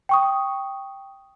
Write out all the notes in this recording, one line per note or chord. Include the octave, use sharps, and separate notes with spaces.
G5 C#6 D#6